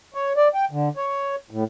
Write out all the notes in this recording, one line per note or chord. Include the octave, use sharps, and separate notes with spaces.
C#5
D5
G5
D3
C#5
A2